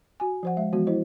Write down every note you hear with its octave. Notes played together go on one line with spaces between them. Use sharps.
F#4 G#5
F3 C5 F#5
G#3 E5
E3 F3 G#3 B3 F#4
E4 C5 D#5